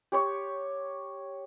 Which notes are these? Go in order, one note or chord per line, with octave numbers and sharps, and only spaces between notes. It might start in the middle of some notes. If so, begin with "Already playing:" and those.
G4 C#5 C#6